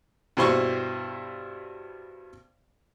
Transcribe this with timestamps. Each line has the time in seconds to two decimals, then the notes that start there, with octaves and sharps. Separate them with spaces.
0.37 G2 B2 E4 C5 C6 C#6